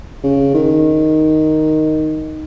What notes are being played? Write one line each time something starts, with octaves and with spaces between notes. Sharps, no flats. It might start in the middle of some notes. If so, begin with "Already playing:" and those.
C#3
D#3